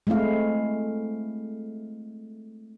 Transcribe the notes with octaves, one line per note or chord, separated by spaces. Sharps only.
G#3 A3 C4 E4 F5